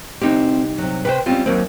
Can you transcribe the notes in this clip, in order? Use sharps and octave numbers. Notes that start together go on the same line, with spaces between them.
C2 C4 D#4 G4
C3 F#3
C3 B4 C5 G5
G3 C4 C#4 F4
D#2 F#3 A#3 C4